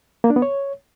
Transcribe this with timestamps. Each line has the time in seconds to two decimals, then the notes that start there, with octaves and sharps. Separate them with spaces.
0.24 A#3
0.30 D4
0.36 B3
0.42 C#5